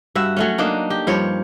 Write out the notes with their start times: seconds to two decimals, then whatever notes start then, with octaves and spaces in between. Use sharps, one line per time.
0.15 G2 F#4 E5
0.37 F#3 A3 C#4
0.58 A#3 D4 D#4
0.90 G4
1.07 G2 F3 C#5